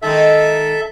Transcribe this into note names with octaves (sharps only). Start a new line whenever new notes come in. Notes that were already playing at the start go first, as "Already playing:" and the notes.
D#3 G#3 D#4 A4 E5